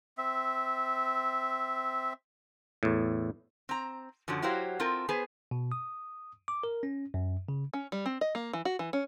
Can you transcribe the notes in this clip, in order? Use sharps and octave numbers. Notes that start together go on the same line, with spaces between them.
C4 E5
E2 A2
C4 A#5
F#2 D3 F3 F#3
F#3 E4 F#4 G4 C5 F5
C4 F4 A4 A#4
B3 G#4 B4 C5
B2
D#6
D6
A#4
C#4
F#2
C#3
C#4
G3
C4
D#5
A#3
E3
F#4
E3
C#4